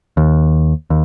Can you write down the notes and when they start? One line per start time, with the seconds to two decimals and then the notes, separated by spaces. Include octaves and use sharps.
0.17 D#2
0.90 D#2